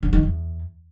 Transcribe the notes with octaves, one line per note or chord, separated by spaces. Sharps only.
D3
D#3
E2